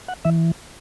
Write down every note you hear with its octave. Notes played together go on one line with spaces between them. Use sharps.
F#5
E3 E5